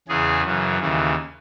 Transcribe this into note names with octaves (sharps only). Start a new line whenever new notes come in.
E2 C#3 E3 G#4
F#2 C#3 E3
D#2 C#3 E3